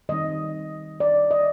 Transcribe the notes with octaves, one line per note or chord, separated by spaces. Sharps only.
D#3 G3 C4 D#4 D#5
D5
D#5